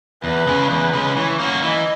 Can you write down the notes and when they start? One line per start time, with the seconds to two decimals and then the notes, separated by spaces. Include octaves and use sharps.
0.24 E2 B4
0.47 C#3 G#3 C#4
0.70 E2 B4
0.93 C#3 G#3 C#4
1.17 E3 C#5
1.40 A#3 C#4 F#4
1.63 E3 D#5